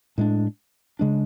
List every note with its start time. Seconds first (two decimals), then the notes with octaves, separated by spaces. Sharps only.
0.18 A2 G#3 D4
0.99 C#3 G#3 D4